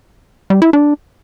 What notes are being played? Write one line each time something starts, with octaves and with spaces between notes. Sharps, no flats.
G3
E4
D4